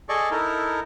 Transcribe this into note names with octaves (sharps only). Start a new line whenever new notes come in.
G#4 A4 D5 D#5 C#6
D#4 E4 A4 A#4